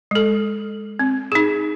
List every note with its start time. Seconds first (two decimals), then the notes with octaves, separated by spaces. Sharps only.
0.11 G#3 A4
0.99 C4
1.32 D#4 G#4